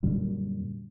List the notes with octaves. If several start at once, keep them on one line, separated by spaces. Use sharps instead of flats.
F#2 A#2 D3 G3